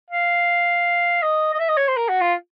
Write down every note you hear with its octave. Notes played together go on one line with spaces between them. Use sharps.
F5
D#5
D#5
E5
D#5
C#5
C5
A#4
F#4
F4